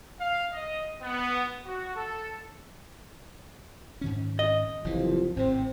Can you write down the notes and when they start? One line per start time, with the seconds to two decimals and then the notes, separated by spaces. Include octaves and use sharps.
0.20 F5
0.52 D#5
1.02 B3
1.66 F#4
1.96 A4
4.01 G#2 D#3 C#4
4.39 D#5
4.84 F#1 C2 E3 F3
5.36 G#1 A2 C3 C4